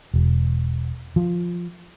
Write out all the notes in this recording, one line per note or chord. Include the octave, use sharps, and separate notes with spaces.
E1
F3